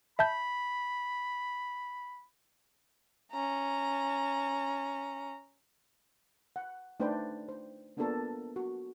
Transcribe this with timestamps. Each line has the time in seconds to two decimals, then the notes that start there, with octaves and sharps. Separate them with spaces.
0.19 E5 A5 B5 G6
3.32 C#4 A#5
6.56 F#5
7.00 A3 D4 D#4 B4 C5 G5
7.48 C5
7.97 A#3 B3 D4 F4 A4 A#4
8.56 F#4